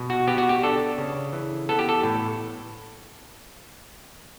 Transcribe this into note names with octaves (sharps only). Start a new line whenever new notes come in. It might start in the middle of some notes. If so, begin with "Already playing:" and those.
Already playing: B2
F#4
B3 G4
F#4
G4
D4 A4
C#3
E3
B3 A4
G4
A4
A2